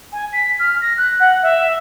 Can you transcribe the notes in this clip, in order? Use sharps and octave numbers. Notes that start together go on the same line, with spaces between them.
G#5
B6
F6
A#6
F#6
F#5
E5